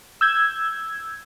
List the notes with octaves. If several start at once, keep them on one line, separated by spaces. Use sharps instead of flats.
E6 G6 G#6